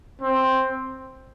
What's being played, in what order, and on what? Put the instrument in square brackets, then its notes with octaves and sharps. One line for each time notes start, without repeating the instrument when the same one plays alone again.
[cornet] C4